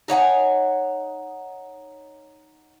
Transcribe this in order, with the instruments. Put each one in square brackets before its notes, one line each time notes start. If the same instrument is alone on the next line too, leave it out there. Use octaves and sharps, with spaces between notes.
[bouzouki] D#4 C#5 F#5 G#5